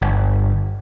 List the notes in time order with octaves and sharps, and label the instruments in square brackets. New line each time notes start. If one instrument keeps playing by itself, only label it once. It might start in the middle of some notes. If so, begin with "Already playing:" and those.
[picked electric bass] G1